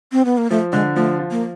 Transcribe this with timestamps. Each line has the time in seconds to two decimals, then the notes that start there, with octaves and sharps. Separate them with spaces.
0.12 C4
0.25 B3
0.38 A#3
0.50 F3 A3
0.72 D3 G#3
0.96 F3 A3
1.19 F3
1.31 A#3